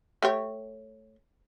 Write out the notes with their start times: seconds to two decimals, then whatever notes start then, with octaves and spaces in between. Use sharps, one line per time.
0.22 A3 G4 C#5